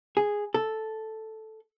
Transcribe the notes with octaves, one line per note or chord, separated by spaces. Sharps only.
G#4
A4